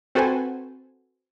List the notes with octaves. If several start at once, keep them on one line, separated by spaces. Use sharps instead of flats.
C4 F#4 A4 B4 C5 G#5